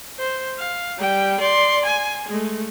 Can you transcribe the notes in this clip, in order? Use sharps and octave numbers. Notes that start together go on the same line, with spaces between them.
C5
F5
G3 G5
D5 C6
G#5
G#3 A3